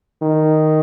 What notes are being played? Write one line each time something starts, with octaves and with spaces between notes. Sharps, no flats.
D#3